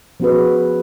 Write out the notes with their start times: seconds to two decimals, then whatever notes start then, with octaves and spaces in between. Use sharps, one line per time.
0.20 F3 B3 C#4 F#4 G#4 B4